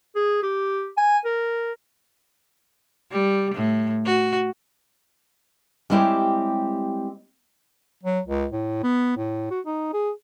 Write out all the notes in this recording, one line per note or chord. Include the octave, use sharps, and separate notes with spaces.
G#4
G4
G#5
A#4
G3
A2
F#4
G3 G#3 C4 E4 G4 C#5
F#3
C#2
A2
B3
A2
F#4
D#4
G#4